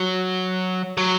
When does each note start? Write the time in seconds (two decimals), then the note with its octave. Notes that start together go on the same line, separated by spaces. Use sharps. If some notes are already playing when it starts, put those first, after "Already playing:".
Already playing: F#3
0.97 F#3